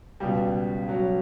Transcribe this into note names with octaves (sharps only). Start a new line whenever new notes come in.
C#2 B2 G3
F#3